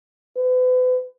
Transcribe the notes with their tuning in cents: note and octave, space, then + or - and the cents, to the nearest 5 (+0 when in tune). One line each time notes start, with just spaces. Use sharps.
B4 +40